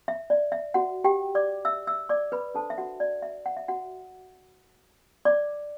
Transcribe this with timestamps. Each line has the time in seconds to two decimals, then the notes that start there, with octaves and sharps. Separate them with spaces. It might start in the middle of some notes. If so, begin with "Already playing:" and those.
0.08 E5
0.30 D5
0.52 E5
0.74 F#4 F#5
1.04 G4 G5
1.35 D5 D6
1.65 E5 E6
1.87 E5 E6
2.09 D5 D6
2.32 B4 B5
2.54 D4 A4 C5 A5
2.70 E5
2.78 F#4 F#5
3.00 D5
3.22 E5
3.46 F#5
3.57 E5
3.68 F#4 F#5
5.25 D5 D6